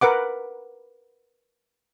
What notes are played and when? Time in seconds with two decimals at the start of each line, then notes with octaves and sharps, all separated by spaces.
0.01 A#4 B4 F#5 D6